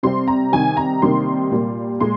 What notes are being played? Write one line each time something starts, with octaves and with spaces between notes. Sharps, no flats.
C3 G3 C4 C6
A#5
C3 D#3 G3 G#5
A#5
C3 D#3 G3 A#3 C6
A#2 G3 A#3
A#2 G#3 C6